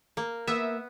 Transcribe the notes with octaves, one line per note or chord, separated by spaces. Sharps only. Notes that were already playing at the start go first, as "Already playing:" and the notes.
A#3
A#3 B3 E5